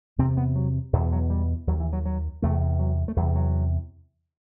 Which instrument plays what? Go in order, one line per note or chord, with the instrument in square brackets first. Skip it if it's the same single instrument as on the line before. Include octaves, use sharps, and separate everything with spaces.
[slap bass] E2 C3 C4
B3
F#3
E2 B2 E3
F#3
G3
D#2 F#3
E3
F#3
F#3
E2 C3 A3
F#3
A3
E2 G3
C3
F#3